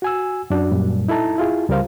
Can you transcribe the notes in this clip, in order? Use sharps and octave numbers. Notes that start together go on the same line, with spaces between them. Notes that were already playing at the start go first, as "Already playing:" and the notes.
F#4 G#5 E6
F#2 D4 F#4
F#2 A#2 G3
D#4 E4 A4 A5 A#5
E4 F4 G#4
C#2 G3 G#3 A#4 C5 F5